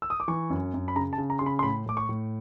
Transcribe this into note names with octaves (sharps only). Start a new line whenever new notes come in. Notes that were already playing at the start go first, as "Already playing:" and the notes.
E6
D#6
D6
E3 C#6
F#2
F#2
B5
C#3 A#5
A5
C#3
A#5
C#3 C6
B5
C6
A2 B5
A2 D6
C#6
A2